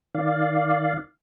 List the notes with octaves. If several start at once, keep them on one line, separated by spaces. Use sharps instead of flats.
D#3 D5 F5